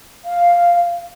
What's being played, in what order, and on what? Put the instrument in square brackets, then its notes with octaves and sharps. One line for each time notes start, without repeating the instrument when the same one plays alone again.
[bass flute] F5